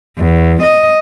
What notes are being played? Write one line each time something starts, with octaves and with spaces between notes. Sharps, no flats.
E2
D#5